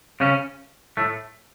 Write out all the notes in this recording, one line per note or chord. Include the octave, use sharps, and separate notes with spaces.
C#3 C#4
A2 A3